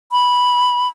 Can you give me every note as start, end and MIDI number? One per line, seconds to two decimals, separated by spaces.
0.12 0.88 83